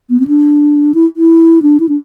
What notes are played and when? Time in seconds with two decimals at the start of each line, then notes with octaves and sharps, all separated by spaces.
0.10 B3
0.20 C4
0.27 D4
0.94 E4
1.17 E4
1.62 D4
1.80 E4
1.89 D4